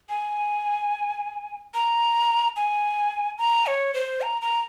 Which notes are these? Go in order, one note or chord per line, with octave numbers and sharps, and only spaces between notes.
G#5
A#5
G#5
A#5
C#5
C5
A#5
A#5